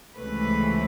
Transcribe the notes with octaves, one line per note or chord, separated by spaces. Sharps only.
C#2 C3 E3 A3 B4